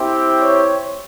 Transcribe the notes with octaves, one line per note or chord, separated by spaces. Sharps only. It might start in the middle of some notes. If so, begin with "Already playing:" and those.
Already playing: C4 E4 G4
C#5